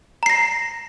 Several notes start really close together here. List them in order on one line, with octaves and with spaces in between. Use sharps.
A#5 C7 A#6